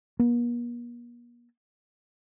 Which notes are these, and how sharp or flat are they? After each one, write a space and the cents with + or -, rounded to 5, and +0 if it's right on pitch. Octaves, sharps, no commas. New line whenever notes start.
A#3 +45